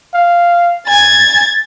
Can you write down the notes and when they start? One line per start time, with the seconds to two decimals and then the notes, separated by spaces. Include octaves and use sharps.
0.14 F5
0.88 G#5 G#6 A6